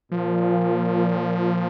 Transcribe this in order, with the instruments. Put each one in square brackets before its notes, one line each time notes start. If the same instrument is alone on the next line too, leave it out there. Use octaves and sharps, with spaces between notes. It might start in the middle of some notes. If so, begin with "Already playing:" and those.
[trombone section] A#2 [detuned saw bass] F3